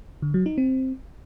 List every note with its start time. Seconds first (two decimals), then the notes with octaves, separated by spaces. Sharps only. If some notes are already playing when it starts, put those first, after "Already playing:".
0.22 D3
0.34 F#3
0.46 D#4
0.58 C4